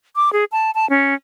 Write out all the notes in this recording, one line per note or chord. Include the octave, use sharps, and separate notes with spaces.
D6
G#4
A5
A5
C#4